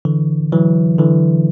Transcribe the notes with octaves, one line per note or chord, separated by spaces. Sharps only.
D3 E3
E3 F#3
D3 E3